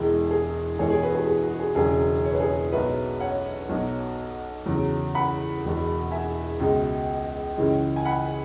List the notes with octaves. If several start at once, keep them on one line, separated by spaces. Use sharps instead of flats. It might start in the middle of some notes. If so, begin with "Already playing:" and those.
Already playing: E1 E2 E3 G#3 G#4
G#4
E1 E2 E3 G#3 G#4 C#5
G#4 C#5
F#4 B4
G#4
G#4
F#4
G#4
E1 E2 C#3 F#3 G#4
C#5
B4
G#4 C#5
B1 B2 F#3 B4 E5
C#5 F#5
B1 B2 F#3
E2 C#3 F#3
F#5 B5
E1 E2 B2
E5 G#5
C#2 B2 G#3
C#2 C#3 E3 G#3
G#5
F#5 B5